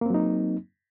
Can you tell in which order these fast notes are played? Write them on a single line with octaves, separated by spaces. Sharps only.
A#3 C4 F#3 D#4